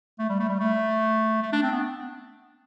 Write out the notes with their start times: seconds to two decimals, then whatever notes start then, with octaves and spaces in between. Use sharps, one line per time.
0.19 A3
0.30 G3
0.40 A3
0.49 G3
0.60 A3
1.42 A3
1.53 D4
1.63 C4
1.73 B3